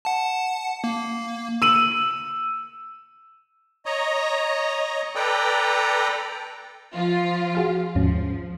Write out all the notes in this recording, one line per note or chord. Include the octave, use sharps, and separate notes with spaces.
F#5 A5
A#3
E6 D#7 F#7
C#5 D#5 A#5
A4 B4 D5 G5 A#5
F3 F4
F#4 G#4 F5
D#2 G#2 F3 C#4